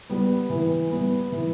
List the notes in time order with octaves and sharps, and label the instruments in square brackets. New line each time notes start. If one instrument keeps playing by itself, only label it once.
[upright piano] G3 B3
E3
G3 B3
E3